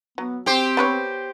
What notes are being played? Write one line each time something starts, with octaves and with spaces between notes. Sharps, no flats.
F#3 B3
C4 G4 C5
B3 B4 C#5